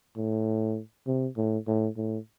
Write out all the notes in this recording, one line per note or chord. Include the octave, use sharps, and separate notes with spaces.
A2
C3
A2
A2
A2